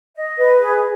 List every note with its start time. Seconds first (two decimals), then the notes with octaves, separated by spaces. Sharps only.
0.15 D#5
0.37 B4
0.60 G#4